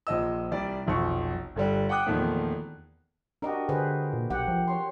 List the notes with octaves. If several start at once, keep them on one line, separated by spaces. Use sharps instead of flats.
A#1 F3 D#5 E6
C2 G3 D5
F1 B1 F3 C#6
G1 D3 G3
F#5 G5 D6 D#6 F#6
E2 A#2 D#3 F3 A3
D4 F#4 G4 A#4 D#5
D3 G#4 B4 C5
A#2
B1 G4 F#5
F3
C#5 C6